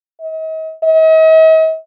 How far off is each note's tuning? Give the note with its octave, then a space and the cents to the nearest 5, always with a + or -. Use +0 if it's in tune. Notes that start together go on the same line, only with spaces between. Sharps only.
D#5 +40
D#5 +45